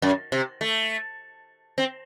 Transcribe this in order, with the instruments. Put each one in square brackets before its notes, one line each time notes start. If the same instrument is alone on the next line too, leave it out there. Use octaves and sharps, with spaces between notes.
[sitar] F#2
C3
A3
C4